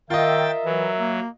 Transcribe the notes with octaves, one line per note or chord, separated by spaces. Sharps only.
D#3 F4 A#4 D#5 E5 G5 A6
E3 F#3
A#3